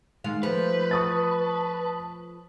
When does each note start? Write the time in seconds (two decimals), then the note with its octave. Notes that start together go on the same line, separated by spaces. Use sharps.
0.24 D#3 G#3 F5
0.43 F3 A3 B4 C5
0.91 A5 C#6 D#6 A6